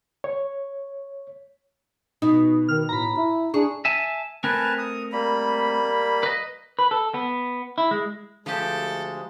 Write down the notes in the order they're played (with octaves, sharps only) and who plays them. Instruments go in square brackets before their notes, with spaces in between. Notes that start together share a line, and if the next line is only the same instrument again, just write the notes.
[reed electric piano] C#5
[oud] B2 [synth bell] D#4
[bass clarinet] D#3 [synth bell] F6
[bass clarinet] A2 [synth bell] A#5 B5
[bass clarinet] E4
[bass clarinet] D4 [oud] G#4 [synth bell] C#6
[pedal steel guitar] E5 G#5 A5
[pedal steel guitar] A3 C4 A#4 [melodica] B4 G#5 A5
[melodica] D#6
G3 A#3 B5
[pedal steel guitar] B4 D#5
[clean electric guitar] B4
A4
B3
E4
G#3
[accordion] D2 G#3 [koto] F3 G4 [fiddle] A4